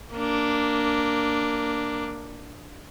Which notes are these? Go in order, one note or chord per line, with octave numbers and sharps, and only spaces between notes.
A#3 D4